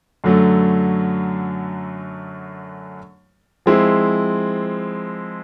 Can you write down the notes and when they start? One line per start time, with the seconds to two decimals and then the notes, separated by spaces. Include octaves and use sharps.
0.24 F#2 D3 F#3 A3
3.66 F3 G#3 C4 E4